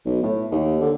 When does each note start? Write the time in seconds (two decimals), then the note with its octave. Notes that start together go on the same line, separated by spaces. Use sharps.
0.06 B1
0.23 A2
0.51 D#2
0.81 D3